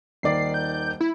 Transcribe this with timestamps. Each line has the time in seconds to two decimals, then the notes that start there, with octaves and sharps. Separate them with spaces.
0.23 D#1 D#3 D5 C7
0.54 G6
1.01 E4